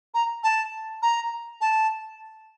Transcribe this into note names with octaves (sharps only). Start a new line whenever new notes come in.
A#5
A5
A#5
A5